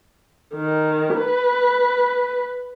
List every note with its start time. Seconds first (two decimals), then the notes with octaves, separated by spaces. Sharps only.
0.54 D#3
1.17 B4